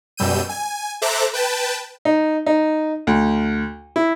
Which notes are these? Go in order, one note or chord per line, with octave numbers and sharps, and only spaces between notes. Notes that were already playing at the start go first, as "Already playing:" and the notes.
F#2 B2 G3 E6 G6 D#7
G#5
A4 C5 E5 A#5 D6 F#6
B4 G5 A5
D#4
D#4
D2
E4